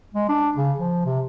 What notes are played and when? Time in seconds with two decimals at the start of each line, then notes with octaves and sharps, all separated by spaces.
0.15 G#3
0.29 D4
0.56 C#3
0.78 F3
1.05 C3